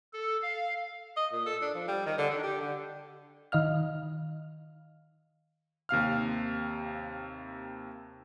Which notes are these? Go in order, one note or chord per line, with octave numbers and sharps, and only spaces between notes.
A4
F5
D#5
A#2
A4
D4
F3
G3
D#3
D3
D4
G4
D3
D#3 D#5 F5 F6
D#2 C3 F5 F6